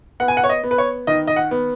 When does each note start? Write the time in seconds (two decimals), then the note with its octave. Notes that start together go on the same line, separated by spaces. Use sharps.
0.20 B3 F#5
0.28 G#5
0.37 F#5
0.44 C#5
0.49 D#5
0.63 B3
0.71 B4
0.78 C#5
1.07 D#3 D#5
1.27 D#5
1.36 F#5
1.51 B3